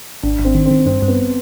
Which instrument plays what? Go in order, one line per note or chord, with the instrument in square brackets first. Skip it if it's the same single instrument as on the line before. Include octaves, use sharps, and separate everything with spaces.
[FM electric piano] G#1 [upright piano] D4
[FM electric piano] G#1
[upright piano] C4
[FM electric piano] D#3
[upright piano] C4
[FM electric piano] D#3
[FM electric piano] G2 [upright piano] C4
[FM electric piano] G2
[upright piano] B3